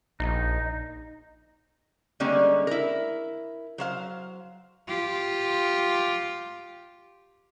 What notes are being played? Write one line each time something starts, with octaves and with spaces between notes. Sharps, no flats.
A#1 D#4
D3 G3 G#3 A#3 C#4
E4 A#4
F#3 C5 F5
F4 G4